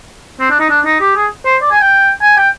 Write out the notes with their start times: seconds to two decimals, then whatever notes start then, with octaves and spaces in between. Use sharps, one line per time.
0.40 C4
0.50 D4
0.60 D#4
0.70 D4
0.85 D#4
1.01 G4
1.15 G#4
1.45 C5
1.62 D5
1.71 G#5
1.81 G5
2.22 G#5
2.37 G5